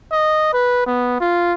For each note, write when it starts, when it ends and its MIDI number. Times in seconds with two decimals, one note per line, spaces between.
0.12 0.53 75
0.53 0.83 71
0.86 1.18 59
1.21 1.53 65